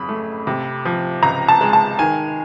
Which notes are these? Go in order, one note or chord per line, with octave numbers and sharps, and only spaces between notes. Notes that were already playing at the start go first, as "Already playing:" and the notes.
Already playing: F2 C#3 F#3 B5
A3
C3
F3
C#2 A#5
A5
G#3
A5
D#3 G#5